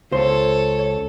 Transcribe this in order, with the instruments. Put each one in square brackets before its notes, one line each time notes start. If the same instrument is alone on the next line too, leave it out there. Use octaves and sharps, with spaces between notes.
[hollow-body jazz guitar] C#2 C5 C6 [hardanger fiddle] A4 C#5